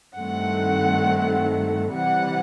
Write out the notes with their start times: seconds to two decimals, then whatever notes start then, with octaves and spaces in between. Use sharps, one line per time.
0.16 G2 D#3 A3 C4 F#5
1.95 C3 E3 G3 F#5